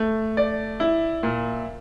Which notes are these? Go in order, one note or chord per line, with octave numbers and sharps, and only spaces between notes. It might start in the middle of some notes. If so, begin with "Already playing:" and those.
Already playing: A3
D5
E4
A#2